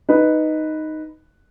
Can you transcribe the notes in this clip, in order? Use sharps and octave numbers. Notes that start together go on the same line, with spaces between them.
D#4 B4